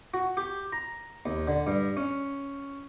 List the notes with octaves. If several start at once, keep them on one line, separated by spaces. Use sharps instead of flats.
F#4
G4
A#5
D#2
D3
G2
C#4